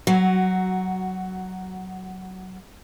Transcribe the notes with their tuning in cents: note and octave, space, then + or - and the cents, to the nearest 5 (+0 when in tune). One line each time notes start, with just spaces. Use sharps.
F#3 +15 F#4 +0